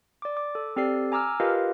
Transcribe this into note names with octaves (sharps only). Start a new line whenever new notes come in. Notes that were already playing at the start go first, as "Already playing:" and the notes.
D5 D6
D6
A4
C4 G4 A4 D5 C7
G#5 A#5 D6 E6 F6
F4 G4 A#4 B4 D#5 F5